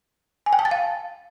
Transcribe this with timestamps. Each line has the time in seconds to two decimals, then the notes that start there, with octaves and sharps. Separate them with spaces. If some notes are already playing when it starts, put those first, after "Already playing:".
0.46 G#5
0.53 G5
0.59 A5
0.65 A6
0.71 F5